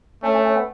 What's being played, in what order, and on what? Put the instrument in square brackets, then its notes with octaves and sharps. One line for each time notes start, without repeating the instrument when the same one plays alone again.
[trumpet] A3 [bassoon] C#4
[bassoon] C#4
C#4
B3